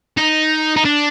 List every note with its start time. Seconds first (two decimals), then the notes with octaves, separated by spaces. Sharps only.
0.17 D#4
0.76 D#4
0.85 D4